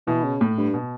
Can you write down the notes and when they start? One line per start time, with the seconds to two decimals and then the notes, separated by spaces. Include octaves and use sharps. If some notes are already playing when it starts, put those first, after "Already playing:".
0.07 B2 E3
0.24 C#3
0.41 A2
0.58 G2
0.74 B2